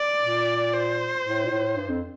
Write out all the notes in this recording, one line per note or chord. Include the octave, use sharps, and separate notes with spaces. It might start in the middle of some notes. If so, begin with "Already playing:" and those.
Already playing: D5
A#2
C5
A2
A#2
A2
G2
F2